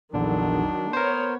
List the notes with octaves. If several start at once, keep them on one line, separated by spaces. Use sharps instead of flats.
A#1 E2 D3 D#3 F#3 D4
B3 A#4 C5 C#5